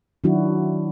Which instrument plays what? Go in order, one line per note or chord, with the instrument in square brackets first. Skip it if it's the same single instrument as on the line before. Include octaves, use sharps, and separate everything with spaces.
[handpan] D#3 F#3 D4 E4 F#4